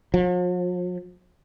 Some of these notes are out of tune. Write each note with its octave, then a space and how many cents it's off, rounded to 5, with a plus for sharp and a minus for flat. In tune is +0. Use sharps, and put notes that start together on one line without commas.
F3 +45